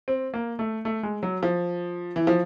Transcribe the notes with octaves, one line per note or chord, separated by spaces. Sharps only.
C4
A#3
A3
A3
G#3
F#3
F3
E3
F3